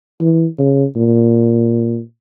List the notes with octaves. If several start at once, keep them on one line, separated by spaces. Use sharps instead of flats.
E3
C#3
A#2